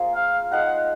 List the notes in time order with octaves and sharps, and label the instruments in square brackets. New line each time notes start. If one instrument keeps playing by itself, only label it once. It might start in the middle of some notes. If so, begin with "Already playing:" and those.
Already playing: [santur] A#3 F4 G#4 C5
[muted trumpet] F5
[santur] G#3 D#4 G#4 D#5 [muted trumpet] F#5